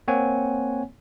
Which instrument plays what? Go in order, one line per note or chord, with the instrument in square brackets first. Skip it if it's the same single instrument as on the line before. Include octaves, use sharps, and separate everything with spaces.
[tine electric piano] A#3 C4 C#5 F#5 G#5